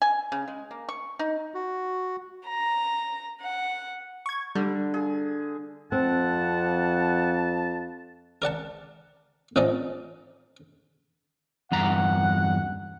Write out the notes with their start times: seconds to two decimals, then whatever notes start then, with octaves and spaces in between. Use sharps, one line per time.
0.02 G#5
0.32 C#3
0.48 G#3
0.71 A#3
0.89 C#6
1.19 D#4
1.54 F#4
2.47 A#5
3.41 F#5
4.26 C#6 G#6
4.55 D3 G3
4.94 G#4
5.92 F2 C4 F#5 A5
8.42 A#4 D5 F#5 A5
9.56 A1 F3 C#4 D#4 D5 D#5
11.72 E2 G2 F#5 A#5